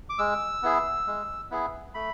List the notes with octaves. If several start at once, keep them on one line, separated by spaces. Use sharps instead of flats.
D6
G#3 E6
B3 E4 G#4
G#3
B3 E4 G#4
A3 B5